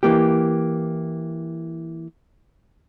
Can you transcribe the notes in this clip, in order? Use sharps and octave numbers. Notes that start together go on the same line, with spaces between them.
E3 A#3 G4